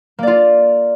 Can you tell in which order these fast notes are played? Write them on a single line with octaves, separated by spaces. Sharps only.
A#3 D5 F4